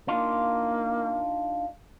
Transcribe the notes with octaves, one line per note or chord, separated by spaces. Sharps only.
A#3 D4 D#4 F4